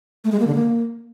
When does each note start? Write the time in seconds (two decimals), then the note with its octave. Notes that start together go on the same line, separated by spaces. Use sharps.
0.24 A3
0.32 G#3
0.40 A#3
0.47 D3
0.55 A#3